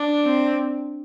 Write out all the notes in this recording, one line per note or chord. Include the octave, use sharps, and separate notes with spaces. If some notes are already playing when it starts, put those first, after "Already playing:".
Already playing: D4
C4